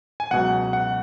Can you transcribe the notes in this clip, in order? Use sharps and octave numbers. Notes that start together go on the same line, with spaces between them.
G#5
C#2 B2 F#3 F#5
F#5